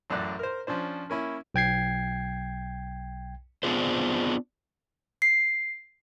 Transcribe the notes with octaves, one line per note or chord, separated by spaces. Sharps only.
A1 F#2 A2 D5 F#6
A#4 C5
F3 C#4 D4 C5
A#3 C#4 E4
B1 G5 G#6 C7
B3 C4 D4 F4 G#4 C5
C7